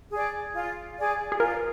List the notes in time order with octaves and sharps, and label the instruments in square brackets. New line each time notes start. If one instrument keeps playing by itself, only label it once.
[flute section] G#4 D5
F4
G#4 D5
[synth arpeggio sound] G#4
[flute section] F4 [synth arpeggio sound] A#4